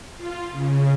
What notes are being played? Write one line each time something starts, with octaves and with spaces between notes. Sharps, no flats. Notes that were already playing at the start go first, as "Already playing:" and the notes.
F4
C#3